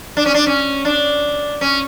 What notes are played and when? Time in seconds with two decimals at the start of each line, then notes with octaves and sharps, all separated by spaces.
0.17 D4
0.26 C#4
0.34 D4
0.47 C#4
0.85 D4
1.61 C#4